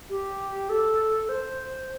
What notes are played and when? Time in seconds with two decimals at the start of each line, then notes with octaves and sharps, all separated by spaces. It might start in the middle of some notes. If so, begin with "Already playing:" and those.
0.10 G4
0.70 A4
1.29 C5